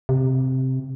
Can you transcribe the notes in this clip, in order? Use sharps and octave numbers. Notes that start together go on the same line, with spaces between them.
C3